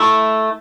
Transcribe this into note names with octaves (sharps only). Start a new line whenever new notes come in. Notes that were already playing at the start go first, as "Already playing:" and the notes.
Already playing: A3 E4